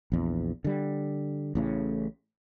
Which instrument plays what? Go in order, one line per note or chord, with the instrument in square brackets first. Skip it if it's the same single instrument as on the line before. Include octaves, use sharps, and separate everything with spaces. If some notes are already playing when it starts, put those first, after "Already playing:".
[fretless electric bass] A#1 E2
D3 G3
A1 A2 C#3